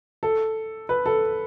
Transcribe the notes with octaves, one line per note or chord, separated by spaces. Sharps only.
A4
B4
A4